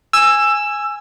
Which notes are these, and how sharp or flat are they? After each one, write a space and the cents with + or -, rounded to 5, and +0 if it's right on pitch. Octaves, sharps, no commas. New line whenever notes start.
G#5 -5 E6 +15